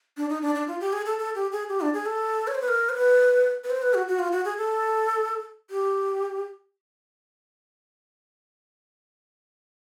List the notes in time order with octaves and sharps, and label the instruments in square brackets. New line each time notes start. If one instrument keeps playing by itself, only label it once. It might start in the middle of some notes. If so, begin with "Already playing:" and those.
[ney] D4
D#4
D4
D4
F4
G4
G#4
A4
A4
G4
G#4
G4
D4
G#4
A4
C#5
C5
B4
A#4
C5
B4
B4
C5
B4
F#4
F#4
F4
F#4
G#4
A4
G4